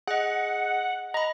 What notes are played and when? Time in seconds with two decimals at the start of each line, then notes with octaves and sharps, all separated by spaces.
0.07 G#4 D#5 F#5
1.14 D#5 A#5 B5